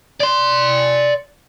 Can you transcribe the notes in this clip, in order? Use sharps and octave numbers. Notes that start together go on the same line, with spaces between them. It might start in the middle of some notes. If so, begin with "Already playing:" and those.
D5 C6